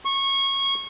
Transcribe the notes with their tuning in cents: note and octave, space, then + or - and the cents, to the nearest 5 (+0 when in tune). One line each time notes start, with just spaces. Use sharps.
C#6 -20